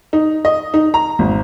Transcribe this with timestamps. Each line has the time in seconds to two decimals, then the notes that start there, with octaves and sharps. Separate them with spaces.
0.13 D#4
0.45 D#5
0.74 D#4
0.94 A#5
1.19 G#1